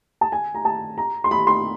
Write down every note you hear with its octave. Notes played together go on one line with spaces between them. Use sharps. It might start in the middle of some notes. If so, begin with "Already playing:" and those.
A5
G#5
A#5
A5
A#5
C6
B5
C6